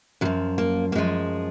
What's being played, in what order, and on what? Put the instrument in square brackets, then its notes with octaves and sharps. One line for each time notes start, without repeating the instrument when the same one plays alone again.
[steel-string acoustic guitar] F#2 F#3
F3
A#3
A#3
F#2 F3 G#3